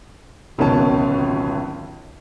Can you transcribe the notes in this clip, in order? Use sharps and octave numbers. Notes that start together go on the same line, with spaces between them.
D1 G#1 C#2 B2 C#4 A5